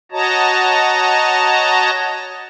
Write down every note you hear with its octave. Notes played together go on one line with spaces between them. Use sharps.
F#4 C#5 D#5 A5 A#5